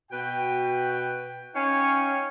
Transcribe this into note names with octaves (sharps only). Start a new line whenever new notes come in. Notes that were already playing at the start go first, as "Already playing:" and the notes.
B2 F#4 B4 G5
C#4 D#4 C#5 F5 G5 G#5